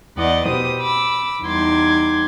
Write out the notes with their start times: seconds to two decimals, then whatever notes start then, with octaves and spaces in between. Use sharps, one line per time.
0.17 E2 D5 D#5 F#5
0.46 B2 G4 C5 D#6
0.80 B5 D6 E6
1.43 E2 G3 D#4 C6 D6 G#6